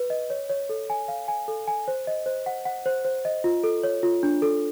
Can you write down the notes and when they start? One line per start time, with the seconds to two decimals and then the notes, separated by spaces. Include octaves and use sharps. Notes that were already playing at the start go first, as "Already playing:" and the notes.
Already playing: B4
0.10 D#5
0.30 C#5
0.50 C#5
0.69 A4
0.90 G#5
1.08 F5
1.28 G#5
1.48 A4
1.68 G#5
1.88 C5
2.07 D#5
2.26 C5
2.46 F#5
2.65 F#5
2.86 C5
3.05 C5
3.25 D#5
3.44 F4
3.63 A4
3.83 C#5
4.03 F4
4.23 D4
4.42 A4